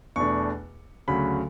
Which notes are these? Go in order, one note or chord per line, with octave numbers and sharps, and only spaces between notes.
E2 B2 A3 D4 C#6
D2 C#3 F#3 B5